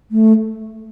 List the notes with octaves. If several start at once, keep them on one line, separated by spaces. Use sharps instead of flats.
A3